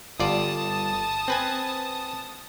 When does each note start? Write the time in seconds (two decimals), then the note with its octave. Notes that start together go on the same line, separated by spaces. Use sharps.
0.20 G1 F4 D5 A5 D#6
1.28 C4 B4 G#5